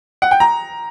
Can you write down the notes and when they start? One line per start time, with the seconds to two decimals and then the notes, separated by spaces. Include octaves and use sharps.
0.22 F#5
0.31 G5
0.40 A#5